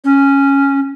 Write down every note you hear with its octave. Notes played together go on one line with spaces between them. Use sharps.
C#4